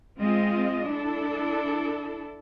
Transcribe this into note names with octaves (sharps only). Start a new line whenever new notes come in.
G#3 C4 F4 D#5
D4 E4 A4